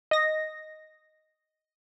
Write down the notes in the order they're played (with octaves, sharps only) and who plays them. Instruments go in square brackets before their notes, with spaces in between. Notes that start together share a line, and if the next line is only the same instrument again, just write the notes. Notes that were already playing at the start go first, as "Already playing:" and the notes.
[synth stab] D#5 A#6